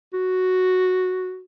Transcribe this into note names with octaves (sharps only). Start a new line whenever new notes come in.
F#4